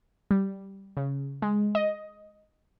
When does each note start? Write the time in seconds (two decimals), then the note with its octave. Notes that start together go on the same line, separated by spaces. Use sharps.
0.31 G3
0.97 C#3
1.42 G#3
1.75 D#5